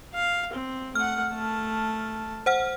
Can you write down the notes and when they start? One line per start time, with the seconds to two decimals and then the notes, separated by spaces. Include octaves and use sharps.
0.14 F5
0.53 C4
0.95 A3 F#5 F6
1.33 A3 A5
2.46 C5 F#5 F6